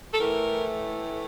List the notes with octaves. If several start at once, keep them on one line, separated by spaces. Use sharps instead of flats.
A4
A2 E3 A3 A#4